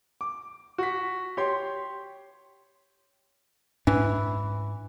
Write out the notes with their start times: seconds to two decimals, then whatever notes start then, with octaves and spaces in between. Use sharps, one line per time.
0.21 D6
0.78 F#4 B6
1.37 G4 C#5 C6
3.87 G#2 E3 C#4 D4